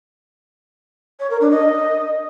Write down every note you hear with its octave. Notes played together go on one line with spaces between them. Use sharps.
C#5
A#4
D4
D#5